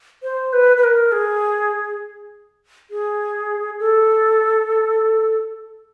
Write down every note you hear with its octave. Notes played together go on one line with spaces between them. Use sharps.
C5
B4
B4
A#4
G#4
G#4
A4